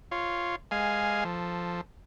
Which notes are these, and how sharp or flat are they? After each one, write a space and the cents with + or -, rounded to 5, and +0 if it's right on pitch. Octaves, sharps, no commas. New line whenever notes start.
F4 -5 C#5 +0
G#3 -10 F5 +0 G#5 +0
F3 +0 A4 +0